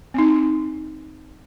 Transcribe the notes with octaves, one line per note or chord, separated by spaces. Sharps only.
C4 D#4